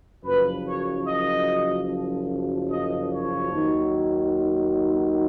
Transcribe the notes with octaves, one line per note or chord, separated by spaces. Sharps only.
F#1 F#2 F3 B4
C#5
D#5
D#5
C#5
D#2 D#3 F#3